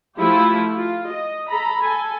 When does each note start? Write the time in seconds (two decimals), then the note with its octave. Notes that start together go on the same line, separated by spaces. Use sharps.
0.18 F3 A3 E4 F4 G4
0.77 F4
1.12 D#5
1.49 A4 A#5 B5
1.81 A4 G#5